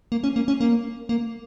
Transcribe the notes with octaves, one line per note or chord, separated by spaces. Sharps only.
A#3
C#4
A#3
C#4
A#3
A#3